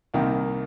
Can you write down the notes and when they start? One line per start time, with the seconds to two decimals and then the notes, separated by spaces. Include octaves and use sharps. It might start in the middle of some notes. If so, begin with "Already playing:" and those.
0.14 C2 C3 D#3 A#3